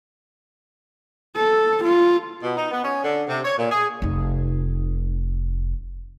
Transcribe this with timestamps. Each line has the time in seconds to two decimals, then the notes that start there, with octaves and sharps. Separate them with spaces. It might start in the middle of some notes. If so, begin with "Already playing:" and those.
1.36 A4
1.84 F4
2.43 B2
2.57 D#4
2.71 B3
2.84 C#4
3.04 D3
3.28 C3
3.45 C#5
3.58 A#2
3.71 G#4
4.02 F1 D#4